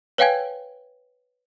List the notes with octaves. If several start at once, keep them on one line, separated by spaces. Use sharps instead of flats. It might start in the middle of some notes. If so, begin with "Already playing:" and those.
B4 C#5 F5 G5 G#5 G#6